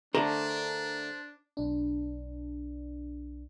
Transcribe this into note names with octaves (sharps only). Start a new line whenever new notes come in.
D3 A3 D4 A#4 C5 A5 D6
B1 D4